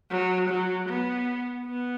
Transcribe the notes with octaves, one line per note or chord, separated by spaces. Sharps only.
F#3
F#3
B3
B3